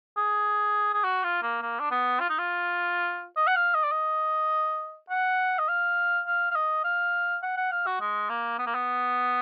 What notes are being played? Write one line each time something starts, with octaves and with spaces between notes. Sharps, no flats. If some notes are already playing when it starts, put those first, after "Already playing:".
G#4
G#4
F#4
F4
A#3
A#3
D4
B3
F4
D#4
F4
D#5
F#5
F5
D#5
D5
D#5
F#5
D#5
F5
F5
F5
D#5
F5
F#5
F#5
F5
F#4
G#3
A#3
B3
A#3
B3